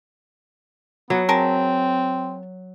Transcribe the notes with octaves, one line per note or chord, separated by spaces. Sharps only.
F#3 B3
C4 G#4 A#4 A5